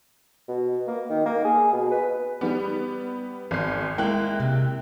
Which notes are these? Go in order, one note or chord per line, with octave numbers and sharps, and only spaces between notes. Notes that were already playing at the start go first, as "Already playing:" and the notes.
B2
A#3
D#3
A#3
G#4
B2
B4
G3 B3
G#1 C7
G#3 A#3 E4 G5 F#6
C3